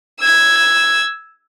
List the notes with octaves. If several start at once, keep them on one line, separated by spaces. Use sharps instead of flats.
E6 G#6